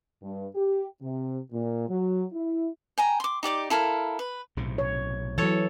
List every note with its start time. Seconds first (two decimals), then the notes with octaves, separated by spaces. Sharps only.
0.23 G2
0.55 G4
1.02 C3
1.52 A#2
1.89 F#3
2.33 E4
2.98 G5 G#5 A#5
3.20 C6 D6
3.43 D#4 G4 D5 D6
3.70 E4 A4 A#4 F5
4.19 B4
4.57 B1 A2 C3
4.78 C#5
5.38 E3 F#3 A4 C#5